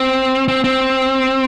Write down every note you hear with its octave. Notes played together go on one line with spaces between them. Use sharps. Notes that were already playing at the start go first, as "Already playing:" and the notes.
Already playing: C4
C4
C4